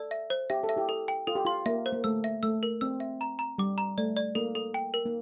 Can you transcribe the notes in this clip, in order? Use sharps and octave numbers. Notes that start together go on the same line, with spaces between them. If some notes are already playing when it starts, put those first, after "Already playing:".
Already playing: A4 D5
E5
C5
G4 E5
A4
E5
E4 G4
A4
G5
F4 A4
G4
F4 C6
A#3 E5
C5
A#3
A3 E6
E5
A3 E6
A#4
C4 E6
E5
A#5
A#5
G3 D6
A#5
A3 D5
D5
A#3 A4
A4
G5
A#4
A#3